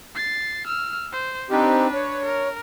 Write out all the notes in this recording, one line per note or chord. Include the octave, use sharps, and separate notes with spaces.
A6 C7
E6 F6
C5
C4 D4 D#4 G4 B4
C#5
A#4